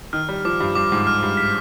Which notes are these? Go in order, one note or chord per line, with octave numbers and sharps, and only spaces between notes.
D#3 F6
G3
F3 D6
G2
G2 D6
G#2
F6
G2
B6